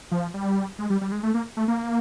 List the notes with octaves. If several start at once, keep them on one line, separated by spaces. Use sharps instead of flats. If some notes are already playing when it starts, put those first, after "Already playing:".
F3
G3
G#3
G3
G3
G#3
A3
A#3
A3
A#3